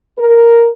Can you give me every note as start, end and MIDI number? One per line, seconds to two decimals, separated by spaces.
0.17 0.68 70